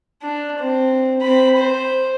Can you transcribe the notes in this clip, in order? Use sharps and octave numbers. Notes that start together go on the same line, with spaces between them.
D4
C4
C4 B5
C5